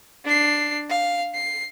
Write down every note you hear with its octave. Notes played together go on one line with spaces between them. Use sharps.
D4 C7
F5
C7